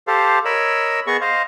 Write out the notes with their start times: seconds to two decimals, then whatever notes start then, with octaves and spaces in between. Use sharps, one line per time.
0.07 G4 A4 C5 F5
0.45 A#4 C#5 D#5 B5 E6
1.07 B3 G#4 D#5 C#6
1.21 C5 D#5 F5